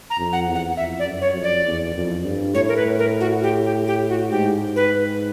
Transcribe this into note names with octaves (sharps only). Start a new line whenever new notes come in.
A#5
F2
F#5
E2
F#5
F2 E5
D5
F#2
C#5
F2
D5
E2
F2
G2
A2 C#5
A#4
B4
A#4
F#4
G4
G4
G4
F#4
G#2 G4
B4